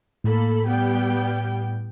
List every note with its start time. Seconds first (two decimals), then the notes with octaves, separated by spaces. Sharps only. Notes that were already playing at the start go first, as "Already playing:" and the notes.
0.24 A2 A#3 A4 B5
0.67 G3 B3 G5